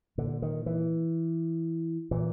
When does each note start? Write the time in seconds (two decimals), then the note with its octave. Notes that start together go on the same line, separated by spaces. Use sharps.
0.18 A#2 D3
0.42 D#3
0.66 E3
2.11 A#2 E3